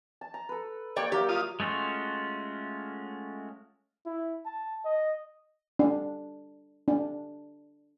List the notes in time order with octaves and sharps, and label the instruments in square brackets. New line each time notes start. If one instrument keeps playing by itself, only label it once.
[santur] A5
A#5
A4 B4
[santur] A#3 G4 C#6 [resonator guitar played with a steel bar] C#5 D5 G5
[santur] F#3 A#3 E5 [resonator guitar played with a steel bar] G4
[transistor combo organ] F4 D#6
[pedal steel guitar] G#3 A3 C#4 F4 F#4
[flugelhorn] E4
A5
D#5
[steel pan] D4
D4